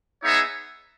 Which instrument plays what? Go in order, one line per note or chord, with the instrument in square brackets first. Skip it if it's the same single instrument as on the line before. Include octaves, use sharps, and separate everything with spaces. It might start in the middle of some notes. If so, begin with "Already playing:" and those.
[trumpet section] B3 D#4 G#4 C#5 E5